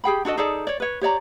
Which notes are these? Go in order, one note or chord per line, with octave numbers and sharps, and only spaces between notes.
G4 G#4 G5 B5
D4 F#4 A4 D#5
D#4 G#4 A4 D5
C#5 D5
B4 C#5
G4 C#5 D5 A#5